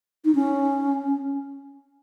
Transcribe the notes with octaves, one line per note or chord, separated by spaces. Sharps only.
D#4
C#4